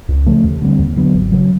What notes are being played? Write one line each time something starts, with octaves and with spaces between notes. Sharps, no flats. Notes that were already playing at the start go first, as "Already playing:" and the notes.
C#2
C#3 F3 A3
D#2
D3 G3 C4
D#2
D3 F#3 B3
G#1
C#3 F#3